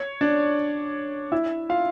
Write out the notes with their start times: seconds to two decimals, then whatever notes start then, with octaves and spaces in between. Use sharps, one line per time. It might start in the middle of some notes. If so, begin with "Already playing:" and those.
Already playing: C#5
0.21 D4 D5
1.32 E4 E5
1.69 F4 F5